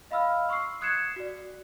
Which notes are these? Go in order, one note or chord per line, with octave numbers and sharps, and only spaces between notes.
D#5 F5 B5 E6 F6
C6 C#6 E6 C7
D#6 F#6 G#6 C7 C#7 E7
F#4 D5